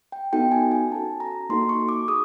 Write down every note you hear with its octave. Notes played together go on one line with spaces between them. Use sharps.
G5
B3 D#4 F#4 A4 G5
G#5
G#5
C#4 F#4 A4 A5
A#5
A#3 D#4 F#4 A4 C6
C#6
D6
G#4 D#6